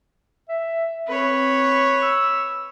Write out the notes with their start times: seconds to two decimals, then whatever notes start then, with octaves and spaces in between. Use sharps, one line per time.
0.49 E5
1.08 C4 B4 C#5
2.02 E6